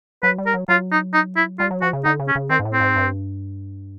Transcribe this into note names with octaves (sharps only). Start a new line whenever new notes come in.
F#3 B4
G3
A#4
F#3
F#3 F4
D#4
D#4
E4
G3 F4
F#3
F3 F#4
C#3
D3 D#4
C#3
C#4
C#3
D#3 C4
G#2
A2
C4
G#2
G2